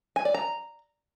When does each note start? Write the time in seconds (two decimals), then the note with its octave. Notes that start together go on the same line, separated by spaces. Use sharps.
0.16 G#5
0.25 D5
0.34 A#5